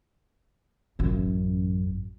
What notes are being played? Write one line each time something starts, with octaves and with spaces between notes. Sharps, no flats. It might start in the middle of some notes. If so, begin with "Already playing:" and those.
A1 F#2